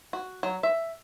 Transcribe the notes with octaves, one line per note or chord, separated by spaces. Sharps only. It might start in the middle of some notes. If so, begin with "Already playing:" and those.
F#4
F#3
E5